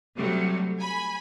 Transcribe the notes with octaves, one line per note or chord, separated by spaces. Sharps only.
C3 F#3 G3 A3
G#5 B5